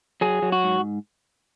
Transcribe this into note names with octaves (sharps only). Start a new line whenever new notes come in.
F#3 G#4
F#3
F#4
G#2